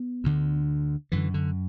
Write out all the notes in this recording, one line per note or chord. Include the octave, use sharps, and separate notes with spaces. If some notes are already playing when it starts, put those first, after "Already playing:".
Already playing: B3
D2 D3
F#2 D3 E3
D3